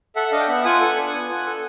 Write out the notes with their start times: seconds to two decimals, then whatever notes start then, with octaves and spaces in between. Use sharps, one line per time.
0.16 A4 E5 F#5
0.32 D4 D#5 F5
0.40 G5
0.48 B3 E5 F#5
0.65 F4 F#5 G#5
0.80 A4
0.97 D4
1.13 B3
1.29 F4
1.46 A4